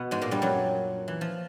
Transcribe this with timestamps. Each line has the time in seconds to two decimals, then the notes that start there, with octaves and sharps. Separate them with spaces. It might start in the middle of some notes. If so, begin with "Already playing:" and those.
Already playing: B2 B3
0.11 G#2 G#3
0.22 A#2 A#3
0.31 G2 G3
0.42 F#2 F#3
1.08 E3
1.21 F3